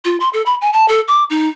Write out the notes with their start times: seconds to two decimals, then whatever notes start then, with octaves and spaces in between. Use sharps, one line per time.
0.05 F4
0.20 C6
0.33 A4
0.46 B5
0.61 G#5
0.73 A5
0.88 A4
1.08 D6
1.30 D#4